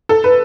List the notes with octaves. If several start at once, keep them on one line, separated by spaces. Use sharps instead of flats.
A4
B4